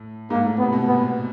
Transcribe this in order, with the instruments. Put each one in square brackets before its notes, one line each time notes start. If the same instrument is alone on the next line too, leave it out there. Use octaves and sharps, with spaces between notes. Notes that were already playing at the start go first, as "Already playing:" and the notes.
Already playing: [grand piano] A2
[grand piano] G#2 [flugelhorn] A#3
[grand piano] A2
[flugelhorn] B3
[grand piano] C3
B2
[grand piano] A#2 [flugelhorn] B3